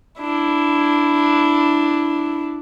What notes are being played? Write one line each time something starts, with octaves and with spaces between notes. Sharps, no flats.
D4 E4